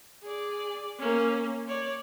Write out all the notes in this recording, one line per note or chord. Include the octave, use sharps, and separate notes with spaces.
G#4 D5
A#3 C#4
C#5 D5